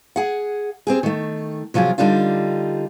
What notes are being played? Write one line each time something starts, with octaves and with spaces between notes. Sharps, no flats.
G#4 F#5
C4 G4 G#4
D#3 A3
C3 F3 F#3 F4 G#4
D3 G3 D4 D#4 F4